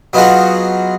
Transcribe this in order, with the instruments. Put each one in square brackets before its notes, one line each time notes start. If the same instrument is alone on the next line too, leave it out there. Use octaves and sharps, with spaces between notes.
[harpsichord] F#3 B3 D#4 F4 F#4 G#4